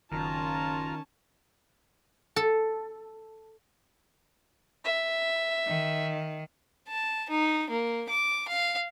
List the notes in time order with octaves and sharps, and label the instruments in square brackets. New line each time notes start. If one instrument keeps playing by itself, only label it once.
[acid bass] F#1 [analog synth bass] D#3 [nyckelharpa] C#4 A5 [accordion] F4 A#5 F6
[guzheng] A4
[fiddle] E5
[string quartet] D#3
[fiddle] A5
D#4
A#3
D6
F5